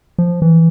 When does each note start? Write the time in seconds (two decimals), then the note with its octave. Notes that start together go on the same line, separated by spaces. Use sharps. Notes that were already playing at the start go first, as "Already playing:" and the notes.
0.18 F3
0.42 E3